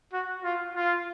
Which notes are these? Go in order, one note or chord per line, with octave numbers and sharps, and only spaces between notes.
F#4
F4
F4